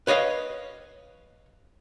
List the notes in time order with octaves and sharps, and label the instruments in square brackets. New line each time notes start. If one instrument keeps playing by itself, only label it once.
[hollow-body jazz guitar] B4 C#5 D#5 F5